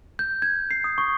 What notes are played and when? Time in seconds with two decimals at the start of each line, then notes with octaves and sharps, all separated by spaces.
0.19 G6
0.42 G#6
0.71 C7
0.84 D#6
0.98 C#6